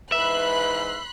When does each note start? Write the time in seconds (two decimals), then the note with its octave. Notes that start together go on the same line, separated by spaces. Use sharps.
0.12 G#2 E3 B4 E5 B5 C6 F#6